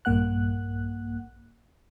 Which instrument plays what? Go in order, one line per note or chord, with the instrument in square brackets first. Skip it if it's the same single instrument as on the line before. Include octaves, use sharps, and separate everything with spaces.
[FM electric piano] A#1 G2 A#3 F#5 F#6